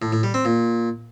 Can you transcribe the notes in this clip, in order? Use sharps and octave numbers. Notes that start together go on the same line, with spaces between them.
A2
A2
G3
C4
A#2